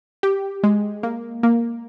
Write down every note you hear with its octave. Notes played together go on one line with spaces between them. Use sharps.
G4
G#3
A#3
A#3